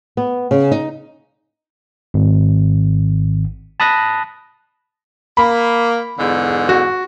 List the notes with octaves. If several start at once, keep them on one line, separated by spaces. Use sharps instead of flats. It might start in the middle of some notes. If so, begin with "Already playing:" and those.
B3
C#3
D#4
G#1
A5 B5 D#6 F#6 A#6
A#3 B5
E2 G#2 D3
F#4